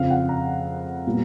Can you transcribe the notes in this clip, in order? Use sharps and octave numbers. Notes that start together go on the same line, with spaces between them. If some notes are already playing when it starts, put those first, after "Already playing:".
Already playing: F2 C#3 F3 F5
F#5
A#5
A#2 G3 B3